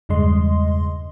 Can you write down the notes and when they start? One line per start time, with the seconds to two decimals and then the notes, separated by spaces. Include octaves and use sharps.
0.09 E2 G2 C#3 G#3 D#5 C6